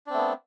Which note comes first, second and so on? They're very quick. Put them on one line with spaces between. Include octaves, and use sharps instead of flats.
D4 C4 A3 B3